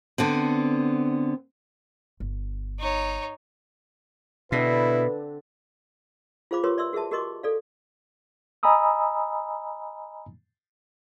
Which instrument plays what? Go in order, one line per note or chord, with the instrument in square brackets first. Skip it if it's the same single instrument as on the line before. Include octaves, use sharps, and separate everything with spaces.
[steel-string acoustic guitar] D3 B3 C4
[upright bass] G1
[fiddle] D#4 C#5
[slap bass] B2 [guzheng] D3 C4 D4 [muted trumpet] E4 [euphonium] B4
[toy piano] F4 G#4 C5 F5 B5 D6
F4 G4 A#4 B4 C#5 C6
D5 E5 C6 E6
F#4 G#4 A#4 E5 A5
F#4 G4 A#4 D#5 C6 D6
A4 D5 F5
[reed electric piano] D#5 G#5 A#5 B5 D#6 E6